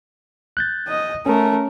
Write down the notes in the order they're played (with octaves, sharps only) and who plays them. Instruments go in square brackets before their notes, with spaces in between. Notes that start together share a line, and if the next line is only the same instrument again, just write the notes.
[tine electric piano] F#6 G6 A6
[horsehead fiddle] D#5
[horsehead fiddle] A3 A#4 [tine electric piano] C#4